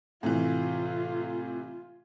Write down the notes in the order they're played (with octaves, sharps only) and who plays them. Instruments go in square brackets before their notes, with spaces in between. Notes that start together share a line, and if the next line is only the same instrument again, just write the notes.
[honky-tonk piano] A2 C3 E3 [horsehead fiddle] F4